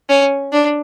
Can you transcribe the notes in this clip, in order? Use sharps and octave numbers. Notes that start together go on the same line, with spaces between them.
C#4
D4